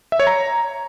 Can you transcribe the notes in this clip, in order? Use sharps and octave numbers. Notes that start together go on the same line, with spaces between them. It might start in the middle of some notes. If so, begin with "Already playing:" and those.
E5
C#5
A#5